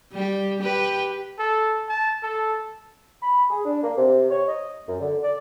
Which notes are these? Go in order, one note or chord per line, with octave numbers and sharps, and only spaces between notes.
G3 G4
G4 B4
A4
A5
A4
B5
G#4
D4
A#3
C3
C#5
D#5
F#2
D3
D5